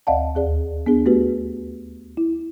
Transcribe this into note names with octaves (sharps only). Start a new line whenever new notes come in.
D2 D5 D#5 F5 F#5 A5
D#2 G#4 D5
B3 D4 G#4
A3 B3 F#4 G4 B4
E4